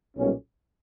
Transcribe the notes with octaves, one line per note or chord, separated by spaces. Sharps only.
B1 A#2 G3 C#4